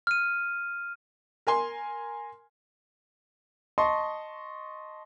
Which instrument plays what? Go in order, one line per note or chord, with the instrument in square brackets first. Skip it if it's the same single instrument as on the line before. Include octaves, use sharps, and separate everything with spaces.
[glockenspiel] F6 D#7
[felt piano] A#4 G#5 C6
[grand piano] D#5 A5 C6 C#6